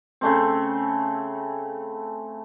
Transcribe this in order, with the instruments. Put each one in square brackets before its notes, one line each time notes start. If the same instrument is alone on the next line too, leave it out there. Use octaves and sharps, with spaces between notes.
[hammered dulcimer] C#3 A3 C4